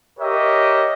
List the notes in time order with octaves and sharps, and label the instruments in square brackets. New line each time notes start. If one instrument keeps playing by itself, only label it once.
[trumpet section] G4 A#4 C#5 D#5 E5